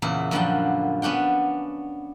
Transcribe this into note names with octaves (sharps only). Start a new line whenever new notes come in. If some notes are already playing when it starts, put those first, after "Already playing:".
E2 A#2 C#3 E4
F#2 D3 F3 G3 F#5 G5
B3 C#4 D4 F#5 G5